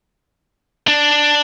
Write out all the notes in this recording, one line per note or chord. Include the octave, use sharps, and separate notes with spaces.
D4